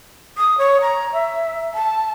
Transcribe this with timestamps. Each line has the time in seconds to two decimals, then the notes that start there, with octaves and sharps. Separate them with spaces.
0.37 D#6
0.58 C#5
0.81 A#5
1.13 E5
1.74 A5